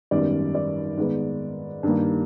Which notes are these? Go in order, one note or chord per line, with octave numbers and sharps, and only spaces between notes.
G#1 F#2 D#3 G3 B3 D5
D5
G#2 D#3 G#3 B3
G2 D#3 G3 A#3